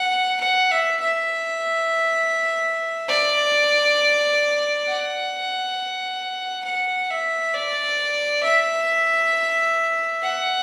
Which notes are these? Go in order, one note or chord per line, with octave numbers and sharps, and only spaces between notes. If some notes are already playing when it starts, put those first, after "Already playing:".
Already playing: F#5
F#5
E5
E5
D5
F#5
F#5
E5
D5
E5
F#5